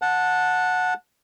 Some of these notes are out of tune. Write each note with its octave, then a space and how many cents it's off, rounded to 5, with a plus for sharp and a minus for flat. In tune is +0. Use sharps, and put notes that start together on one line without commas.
F#5 -15 A5 +0